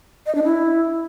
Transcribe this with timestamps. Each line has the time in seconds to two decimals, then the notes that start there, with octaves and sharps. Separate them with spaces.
0.26 D#5
0.35 D4
0.44 E4